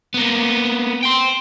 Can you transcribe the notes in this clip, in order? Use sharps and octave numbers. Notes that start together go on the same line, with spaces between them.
A#3 B3
G5 C6